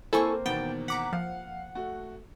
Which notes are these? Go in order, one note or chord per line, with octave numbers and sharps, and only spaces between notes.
A#3 C4 E4 A4 G#5 C#6
E2 B2 D#3 B3 G5 A6
F#5 A#5 D6 B6
F3 F5
A3 F#4